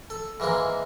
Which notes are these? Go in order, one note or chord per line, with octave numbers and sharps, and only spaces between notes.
A4
G#2 E3 G#3 A#3